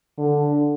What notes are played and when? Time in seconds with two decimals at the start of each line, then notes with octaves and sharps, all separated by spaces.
0.18 D3